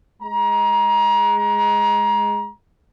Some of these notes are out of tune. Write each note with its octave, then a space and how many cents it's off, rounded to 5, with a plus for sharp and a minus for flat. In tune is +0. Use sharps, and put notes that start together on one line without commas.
G#3 +0 A#5 +30